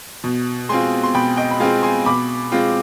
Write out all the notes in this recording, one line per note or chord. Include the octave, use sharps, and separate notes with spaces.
B2
G#3 C4 F4 G#5 C6
C6
B2 G5 B5
D#5 G5
B5
G#3 C4 F4 F5 G#5
G#5 C6
B2 B5 D6
G#3 C4 F4